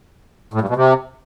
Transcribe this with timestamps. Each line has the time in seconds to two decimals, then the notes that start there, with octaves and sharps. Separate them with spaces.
0.54 A2
0.61 G2
0.69 B2
0.76 C3